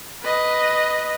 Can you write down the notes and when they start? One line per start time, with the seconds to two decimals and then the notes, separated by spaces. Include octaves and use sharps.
0.23 B4 D#5